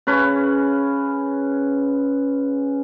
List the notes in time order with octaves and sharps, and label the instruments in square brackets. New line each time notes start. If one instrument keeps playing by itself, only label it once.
[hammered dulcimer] C#3 C#4 B4